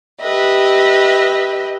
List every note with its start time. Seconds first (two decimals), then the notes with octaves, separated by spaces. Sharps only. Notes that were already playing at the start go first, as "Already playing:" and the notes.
0.20 G4 B4 D#5 E5